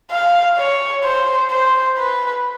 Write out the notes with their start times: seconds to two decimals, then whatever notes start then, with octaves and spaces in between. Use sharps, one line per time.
0.10 F5
0.57 C#5
1.03 C5
1.50 C5
1.98 B4